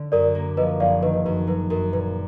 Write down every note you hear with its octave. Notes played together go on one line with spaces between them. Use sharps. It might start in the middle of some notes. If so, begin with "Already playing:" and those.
Already playing: D3
F#2 A#4 D5
A#3
F3 B4 D#5
F#1 D5 F5
D#3 B4 D#5
B4 D#5
F#2 B4
F#3 B4
F#2 A#4
A#2 B4